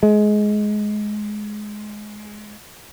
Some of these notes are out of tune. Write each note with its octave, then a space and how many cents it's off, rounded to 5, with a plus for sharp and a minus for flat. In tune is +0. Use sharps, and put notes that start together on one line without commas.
G#3 +15